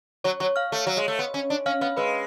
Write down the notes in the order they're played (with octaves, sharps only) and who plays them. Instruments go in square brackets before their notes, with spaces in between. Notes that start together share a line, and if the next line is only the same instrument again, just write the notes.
[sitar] F#3 [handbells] C#5 C#6
[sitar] F#3 [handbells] C#5 C#6
[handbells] F5 F6
[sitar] A3
F#3
G#3
A3
B3
C#4
D4
[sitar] C#4 [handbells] F5 F6
[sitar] B3 [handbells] F5 F6
[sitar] G#3 [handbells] B4 B5